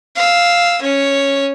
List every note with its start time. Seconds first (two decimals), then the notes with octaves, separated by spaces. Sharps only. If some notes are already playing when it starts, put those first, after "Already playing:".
0.16 F5 E6
0.82 C#4 C#5